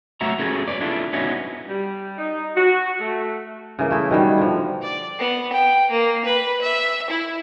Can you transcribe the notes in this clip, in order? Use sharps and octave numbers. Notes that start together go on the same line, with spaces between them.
F#3 A3 F#4 E5 F#5 A#5
C#4 F#4 G#4 A4
B4 C#5 D5
D4 E4 F4 A4
B3 C#4 D#4 E4 F#4
G3
D#4
F#4
A3
C#3 E3 A#3
A3 E4 G#4
B2 D#3 G3
D3 F3
D5
B3
G5
A#3
B4
E5
E4